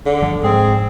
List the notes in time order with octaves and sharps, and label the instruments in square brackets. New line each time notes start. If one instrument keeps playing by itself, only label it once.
[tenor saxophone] D3
[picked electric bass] G1 F3
[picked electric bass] G#2 [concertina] C4 [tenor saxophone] G#4